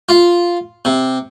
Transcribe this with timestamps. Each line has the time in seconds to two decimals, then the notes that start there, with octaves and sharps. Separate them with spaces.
0.09 F4
0.85 C3